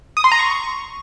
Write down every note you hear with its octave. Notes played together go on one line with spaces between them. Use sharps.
D#6
C6
A#5
C#6